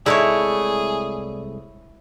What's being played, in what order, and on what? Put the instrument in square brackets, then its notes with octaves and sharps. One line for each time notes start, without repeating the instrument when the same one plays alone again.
[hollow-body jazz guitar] C2 G#3 A3 [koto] E4 C#5 [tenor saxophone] G#4 [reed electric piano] D5